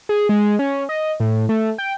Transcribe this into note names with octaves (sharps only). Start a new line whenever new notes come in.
G#4
G#3
C#4
D#5
A2
A3
G5